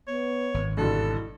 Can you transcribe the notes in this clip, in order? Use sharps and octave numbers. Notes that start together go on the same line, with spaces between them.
B3 C#5
G#1
G2 B2 D3 E4 A4